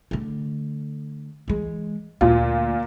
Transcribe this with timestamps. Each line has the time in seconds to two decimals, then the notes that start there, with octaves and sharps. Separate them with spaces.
0.11 D3 A3
1.48 E3 G#3
2.21 D2 A#2 F4